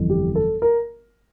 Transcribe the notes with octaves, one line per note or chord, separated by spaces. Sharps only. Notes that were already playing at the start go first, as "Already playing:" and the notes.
Already playing: G1 F2 E3
G4
A4
A#4